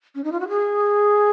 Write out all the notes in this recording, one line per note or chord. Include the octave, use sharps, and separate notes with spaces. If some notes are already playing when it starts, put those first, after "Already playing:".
C#4
D#4
F4
F#4
G#4